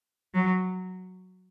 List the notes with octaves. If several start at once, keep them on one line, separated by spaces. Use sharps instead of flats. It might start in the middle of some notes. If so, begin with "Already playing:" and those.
F#3